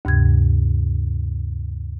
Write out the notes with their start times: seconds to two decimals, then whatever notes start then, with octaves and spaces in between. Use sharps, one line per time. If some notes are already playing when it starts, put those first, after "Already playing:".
0.05 D2 G2 C3 G#6